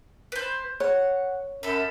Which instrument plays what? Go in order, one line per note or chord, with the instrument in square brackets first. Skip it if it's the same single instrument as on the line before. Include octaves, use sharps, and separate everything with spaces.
[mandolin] B4 C5
[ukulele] C#5 [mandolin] F#5
[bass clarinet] F#2 [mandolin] A4 B5